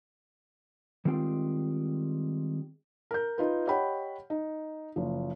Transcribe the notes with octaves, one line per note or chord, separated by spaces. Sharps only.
D#3 G3 G#3 C4 F4 G5
A#4 G6
D#4 F4 B4
G4 C#5 D#5 F#5 G5 B5
D#4
F#1 F3